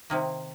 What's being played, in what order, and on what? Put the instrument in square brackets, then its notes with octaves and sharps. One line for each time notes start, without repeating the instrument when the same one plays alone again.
[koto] C3 D#3 A#3